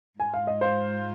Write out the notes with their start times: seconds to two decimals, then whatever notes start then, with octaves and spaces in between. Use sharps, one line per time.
0.20 G#2 G#3 F4 G#5
0.34 F5
0.47 D#5
0.61 C5 F5